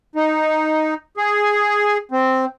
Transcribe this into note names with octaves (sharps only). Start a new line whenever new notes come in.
D#4
G#4
C4